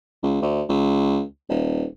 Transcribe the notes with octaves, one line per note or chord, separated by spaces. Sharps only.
C#2
D2
C#2
D#1